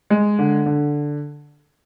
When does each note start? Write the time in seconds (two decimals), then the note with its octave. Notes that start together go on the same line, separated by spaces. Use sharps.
0.10 G#3
0.39 D3
0.66 D3